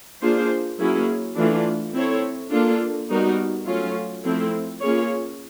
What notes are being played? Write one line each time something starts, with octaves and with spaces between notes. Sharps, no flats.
A#3 D4 F4 G#4 C5
F#3 A#3 C#4 E4 G#4
E3 A3 D4 F4
C4 E4 A4 C#5
A#3 D4 F4 A4
G3 B3 D#4 F#4 A#4
F#3 A3 C#4 F4
F3 A3 C4 E4
A#3 C#4 F4 G#4 C#5